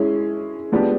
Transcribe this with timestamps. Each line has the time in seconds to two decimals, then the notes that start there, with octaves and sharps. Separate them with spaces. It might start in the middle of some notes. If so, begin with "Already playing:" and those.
Already playing: G#3 C#4 E4 G#4
0.72 F3 G#3 B3 D4 G4